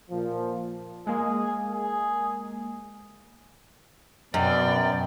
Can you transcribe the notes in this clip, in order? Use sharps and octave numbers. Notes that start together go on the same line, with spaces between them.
A#2 F3
G#3 A#3 G#4
G#4
F#2 B2 D5 G5